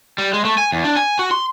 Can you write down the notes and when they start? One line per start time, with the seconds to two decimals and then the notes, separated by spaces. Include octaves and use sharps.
0.18 G3
0.33 G#3
0.45 A3
0.58 G#5
0.72 E2
0.84 D4
0.97 G#5
1.19 F#4
1.31 C6